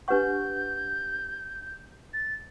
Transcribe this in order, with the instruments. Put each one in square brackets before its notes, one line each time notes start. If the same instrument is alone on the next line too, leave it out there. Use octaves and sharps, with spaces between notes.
[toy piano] D4 G4 B4 F#5 C#6 [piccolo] G6
[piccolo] A6